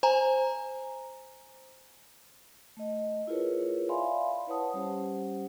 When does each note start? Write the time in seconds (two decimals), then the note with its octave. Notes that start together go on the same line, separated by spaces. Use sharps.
0.03 C5 G#5 A#5
2.77 A3 D#5
3.27 E4 F4 G#4 A#4 B4 C#5
3.89 D5 E5 F5 G#5 B5 C6
4.47 E4 B4 C#5 F#5 A5 D#6
4.74 G3 C#4 G4 C5 F#5